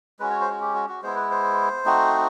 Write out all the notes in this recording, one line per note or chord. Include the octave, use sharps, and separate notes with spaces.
G#3 C#4 F#4 B4
C#5
C5
F#4
G4
F#4
F#4
G#3 B3 E4 C5
B4
C5
A3 C4 D#4 F#4